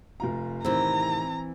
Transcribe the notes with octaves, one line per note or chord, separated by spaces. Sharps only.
F1 F4 A#5
A2 C3 D#3 E3 C4 A#5